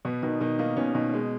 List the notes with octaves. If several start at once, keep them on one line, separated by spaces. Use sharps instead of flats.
B2 B3
B2 D#3 D#4
B2 D#3 D#4
D#3 A#3 D#4
B2 C#4
B2 D#3 D#4
G#3